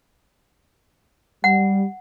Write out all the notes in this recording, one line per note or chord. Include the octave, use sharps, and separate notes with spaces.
G3 F#5